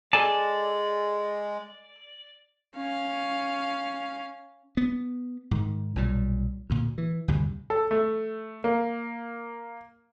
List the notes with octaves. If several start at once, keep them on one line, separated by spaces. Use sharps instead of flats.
G#3 A4 D5 G#5 A5
C#4 F5
B3
G#2 D#3
B1 A#2 G3
D2 A#2
E3
D2 G2 C3
A4
A3
A#3